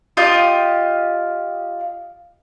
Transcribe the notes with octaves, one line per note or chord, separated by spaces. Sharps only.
F4 G4 D#5 G6